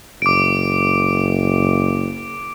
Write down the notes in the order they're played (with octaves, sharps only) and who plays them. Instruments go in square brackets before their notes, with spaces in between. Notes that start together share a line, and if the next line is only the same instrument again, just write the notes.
[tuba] F#1 [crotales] D6 D7